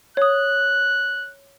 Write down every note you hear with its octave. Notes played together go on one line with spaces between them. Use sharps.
C#5 D#6 F#6